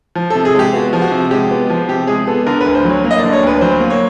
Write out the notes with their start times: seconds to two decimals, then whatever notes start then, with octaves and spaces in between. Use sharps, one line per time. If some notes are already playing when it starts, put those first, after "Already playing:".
0.15 F3
0.30 C3 A4
0.45 G#4
0.55 G#3 G4
0.73 B3 F#4
0.93 F3
1.02 F#4
1.12 C3
1.31 G#3 G4
1.51 B3
1.70 F3
1.88 C3 G4
2.07 G#3 G#4
2.27 B3 A4
2.47 D3 A#4
2.61 B4
2.66 D2
2.75 C5
2.85 F#3 C#5
3.04 A#3
3.11 D#5
3.18 D3 D5
3.33 C#5
3.43 D2 B4
3.61 F#3 C5
3.80 A#3
3.90 C#5